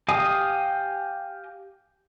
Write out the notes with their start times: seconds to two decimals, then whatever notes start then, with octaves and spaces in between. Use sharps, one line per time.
0.08 G4 D#5 F5 G#5 D#6